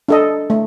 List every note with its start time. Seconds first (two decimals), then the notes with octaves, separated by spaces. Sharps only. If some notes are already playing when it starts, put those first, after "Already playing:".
0.08 D4 A4 D#5
0.50 A3